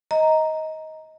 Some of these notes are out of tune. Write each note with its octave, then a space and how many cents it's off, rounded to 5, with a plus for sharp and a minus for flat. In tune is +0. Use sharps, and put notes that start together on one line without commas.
D#5 +20 A#5 +0